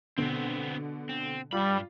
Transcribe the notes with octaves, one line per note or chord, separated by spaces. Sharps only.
B2 D3 B3 C4
C4
G2 G3 F4 B5